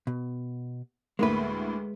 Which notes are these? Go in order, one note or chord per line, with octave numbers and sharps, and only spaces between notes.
B2
D2 A2 G#3 A#3 B4